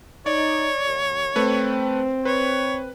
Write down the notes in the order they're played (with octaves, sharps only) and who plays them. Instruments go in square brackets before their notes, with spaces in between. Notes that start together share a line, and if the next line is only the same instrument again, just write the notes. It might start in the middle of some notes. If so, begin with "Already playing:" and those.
[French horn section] D#4 [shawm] C#5 [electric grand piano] D5
[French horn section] D#2
[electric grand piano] A3 B4 [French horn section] C4
[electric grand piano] B4 [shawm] C#5